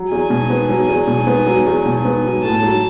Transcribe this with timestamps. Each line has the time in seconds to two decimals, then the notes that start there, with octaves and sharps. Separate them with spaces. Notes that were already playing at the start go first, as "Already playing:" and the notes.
Already playing: F#3
0.11 E2 G#5
0.30 B2
0.50 B3
0.69 F#3
0.88 E2
1.07 B2
1.27 B3
1.46 F#3
1.66 E2
1.85 B2
2.05 B3
2.24 F#3
2.43 A2 A5
2.63 F#3